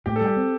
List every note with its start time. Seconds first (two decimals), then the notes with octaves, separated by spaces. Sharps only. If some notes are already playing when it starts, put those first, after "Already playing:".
0.06 A2 G4
0.16 A4
0.21 G3 G4
0.36 C4